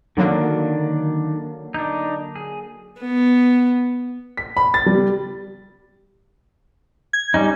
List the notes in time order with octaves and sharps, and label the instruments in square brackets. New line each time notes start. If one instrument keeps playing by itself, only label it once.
[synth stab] D3 F#3 A#3 [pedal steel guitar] D#3 D4
[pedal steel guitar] D4 D#4
G#4
[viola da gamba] B3
[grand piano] B6
B5
A6
G3
[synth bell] G#6
[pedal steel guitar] G3 C#4 D#4